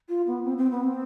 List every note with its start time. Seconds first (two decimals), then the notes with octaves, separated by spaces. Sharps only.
0.09 F4
0.27 B3
0.44 C4
0.58 C4
0.71 B3
0.84 C4